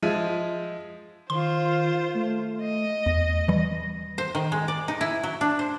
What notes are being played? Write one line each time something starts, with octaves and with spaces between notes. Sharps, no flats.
F3 G#3 E5 D#7
D#3 F4 C5 C6
A3
D#5
E2 A#6
E3 G3
C5
D#3
G#3
D5
D#4
E4
F#3
D4
C5